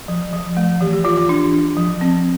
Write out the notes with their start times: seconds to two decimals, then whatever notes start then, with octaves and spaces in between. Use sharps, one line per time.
0.08 F3
0.33 F3
0.57 A3
0.81 E3 G4
0.93 G4
1.04 E3 F4
1.17 F4
1.29 D4
1.52 D4
1.77 F3
2.01 C4